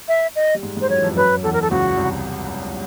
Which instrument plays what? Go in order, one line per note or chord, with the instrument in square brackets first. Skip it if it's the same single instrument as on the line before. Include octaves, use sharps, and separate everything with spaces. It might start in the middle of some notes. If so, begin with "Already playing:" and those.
[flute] E5
D#5
[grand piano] G3
G#2 G#3
G#2 G#3
[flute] C5
[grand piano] F#2 F#3 [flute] C#5
[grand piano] E3
F2 F3
[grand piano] F#2 F#3 [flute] B4
[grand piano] E2 E3 [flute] A4
[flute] A#4
A4
[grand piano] C#2 C#3 [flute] F#4
[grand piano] C2 C3